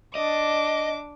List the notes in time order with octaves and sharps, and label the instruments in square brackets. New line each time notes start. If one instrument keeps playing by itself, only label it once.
[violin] D4 D6 [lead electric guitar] D#5